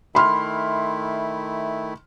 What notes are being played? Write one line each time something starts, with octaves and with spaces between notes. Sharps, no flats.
D#3 A3 E4 B5 C6 F6